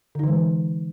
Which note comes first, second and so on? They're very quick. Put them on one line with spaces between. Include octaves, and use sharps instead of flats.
D3 D#4 E3 G#3